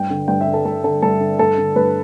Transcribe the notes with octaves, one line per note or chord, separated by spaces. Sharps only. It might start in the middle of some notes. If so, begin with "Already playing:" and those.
Already playing: G2 G5
D3
G2 G5
E5
D3
A4
G2 A4
D3 A4
G2 A4
D3
G2 A4
D3
G2 B4